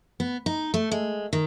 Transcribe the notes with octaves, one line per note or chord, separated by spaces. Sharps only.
B3
D#4
A3
G#3
D#3